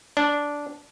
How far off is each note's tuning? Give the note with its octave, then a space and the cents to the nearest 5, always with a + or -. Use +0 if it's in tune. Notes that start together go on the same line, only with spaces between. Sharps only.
D4 -10